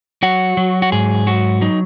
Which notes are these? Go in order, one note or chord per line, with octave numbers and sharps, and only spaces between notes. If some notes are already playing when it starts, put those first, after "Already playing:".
F#3 F#4
F#3
F#4
G#2 G#4
F#3 F#4
F#3 D#4